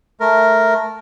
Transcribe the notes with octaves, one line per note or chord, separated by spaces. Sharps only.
A3 A#4